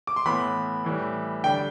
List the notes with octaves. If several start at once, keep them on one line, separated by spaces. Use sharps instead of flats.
D6
C6
A2 E3 B3 B5
A2 E3 G3
D3 G3 D4 G5